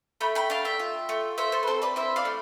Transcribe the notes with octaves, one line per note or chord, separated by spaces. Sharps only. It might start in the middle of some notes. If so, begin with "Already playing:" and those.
A3 G5 B5
G5 B5
D4 F5 A5
E5 G5
F4
A3
A3 C5 E5
A4 C5
B4
C4 A4 C5
B4 D5
E4 C5 E5
D5 F5
A3